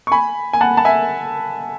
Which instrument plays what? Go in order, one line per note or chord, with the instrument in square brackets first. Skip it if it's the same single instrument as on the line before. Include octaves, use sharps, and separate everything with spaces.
[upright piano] C#6
G#5 B5
G#5
F#5 A5
A5
E5 G#5